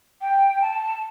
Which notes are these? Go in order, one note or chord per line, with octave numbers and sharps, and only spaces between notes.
G5
A5